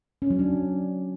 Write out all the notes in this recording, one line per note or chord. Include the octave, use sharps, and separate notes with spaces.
C#4
F#3
D4